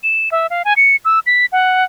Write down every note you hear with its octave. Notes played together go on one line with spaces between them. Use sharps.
E7
E5
F5
G#5
C#7
E6
B6
F#5